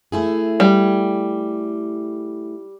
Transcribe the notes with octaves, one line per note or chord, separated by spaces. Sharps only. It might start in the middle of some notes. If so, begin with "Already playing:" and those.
A3 E4 G#4
G3